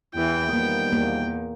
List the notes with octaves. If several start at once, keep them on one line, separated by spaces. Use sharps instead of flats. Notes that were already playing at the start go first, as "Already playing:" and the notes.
E2 E3 E4 G5
D#3 F3 G3 A#3 B3
E2 A#3